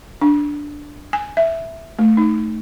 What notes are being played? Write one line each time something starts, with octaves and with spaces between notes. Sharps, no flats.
D4
G#5
E5
A3
D#4